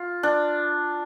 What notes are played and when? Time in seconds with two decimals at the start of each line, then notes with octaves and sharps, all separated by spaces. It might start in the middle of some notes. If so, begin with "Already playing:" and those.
Already playing: F4
0.23 D4